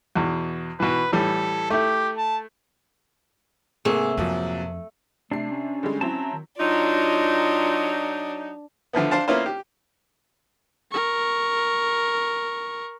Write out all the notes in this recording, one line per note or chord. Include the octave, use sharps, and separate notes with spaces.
E2 B2
B2 E3 B4
A2 E3 G3 A4
A3 E4 G4
A5
G#2 C3 A3 A#3 G#4
F2 G#2 F3 F#3
C3 A3 D4 C7
C#4
D3 G3 G#3
F#3 C4 E4 A5 A#5
D#3
F#3 D4 D#4 F4
D3 F3 A3 B3
D4 C5 F5 A5
A#3 B3 C#4 E4 F4 C5
G4
A#4 C#6